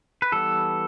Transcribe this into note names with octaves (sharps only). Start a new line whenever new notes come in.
B4
E3 G3 B3 A4